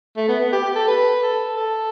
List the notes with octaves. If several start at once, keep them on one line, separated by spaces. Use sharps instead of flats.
A3
B3
B3
G4
G4
A4
B4
A4
A4